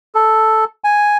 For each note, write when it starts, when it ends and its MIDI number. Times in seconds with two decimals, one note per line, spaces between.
0.15 0.65 69
0.84 1.18 80